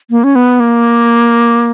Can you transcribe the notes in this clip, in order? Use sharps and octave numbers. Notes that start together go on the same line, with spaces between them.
A#3
C#4
B3
A#3